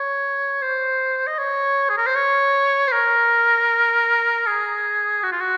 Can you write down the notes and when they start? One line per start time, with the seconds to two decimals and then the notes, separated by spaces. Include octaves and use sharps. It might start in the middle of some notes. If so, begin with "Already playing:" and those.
Already playing: C#5
0.62 C5
1.27 D#5
1.39 C#5
1.89 G#4
1.98 A#4
2.06 C5
2.15 C#5
2.88 C5
2.92 A#4
4.46 G#4
5.23 F#4
5.32 F4
5.41 F#4